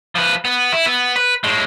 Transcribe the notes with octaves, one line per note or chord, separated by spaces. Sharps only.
F3 B4
B3
E4
B3
B4
A2 G#3